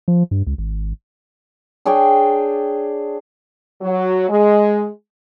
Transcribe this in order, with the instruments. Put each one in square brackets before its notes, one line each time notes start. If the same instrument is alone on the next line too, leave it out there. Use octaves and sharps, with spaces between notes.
[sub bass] F3
G2
C#2
G#1
[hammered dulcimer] D4 G#4 C#5 G5
[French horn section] F#3
G#3